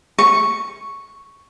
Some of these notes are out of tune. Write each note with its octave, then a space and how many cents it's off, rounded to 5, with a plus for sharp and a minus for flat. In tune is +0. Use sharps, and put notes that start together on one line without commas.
C#6 +0